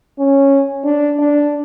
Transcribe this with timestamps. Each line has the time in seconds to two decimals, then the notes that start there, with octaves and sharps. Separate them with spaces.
0.19 C#4
0.84 D4
1.19 D4